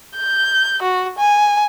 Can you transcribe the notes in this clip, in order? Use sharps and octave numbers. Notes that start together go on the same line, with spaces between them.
G6
F#4
G#5